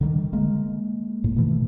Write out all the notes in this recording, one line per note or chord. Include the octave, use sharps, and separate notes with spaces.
D3 D#3 G3
G#3 A#3
A2
B2 D#3 E3 A3